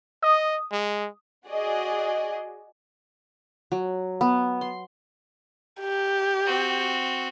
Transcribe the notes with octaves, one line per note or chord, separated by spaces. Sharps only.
D#5 D#6
G#3
F#4 G#4 D5 D#5
F#3
B3
C6
G4
C4 F#4